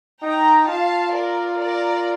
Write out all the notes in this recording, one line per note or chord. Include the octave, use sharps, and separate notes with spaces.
D#4 G5 A#5
F4 F5 A5
A#4 D5
A#4 D5